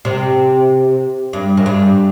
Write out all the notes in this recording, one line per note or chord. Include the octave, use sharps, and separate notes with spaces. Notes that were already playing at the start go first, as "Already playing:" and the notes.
C3
G2
F#2
G2